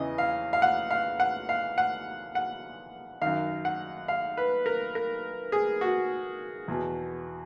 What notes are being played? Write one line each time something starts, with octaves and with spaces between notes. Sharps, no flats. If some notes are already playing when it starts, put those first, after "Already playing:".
Already playing: E2 C#3 E3 D#5
F5
F5
F#5
F5
F#5
F5
F#5
F#5
F#2 D#3 F5
F#5
F5
B4
A#4
A#4
G#4
F#4
E2 B2